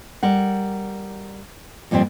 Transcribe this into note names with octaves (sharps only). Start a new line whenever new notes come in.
G3 A#4 F#5
F2 A#2 F3 G3 C4